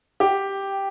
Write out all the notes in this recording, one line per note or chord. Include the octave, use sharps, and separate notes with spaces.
G4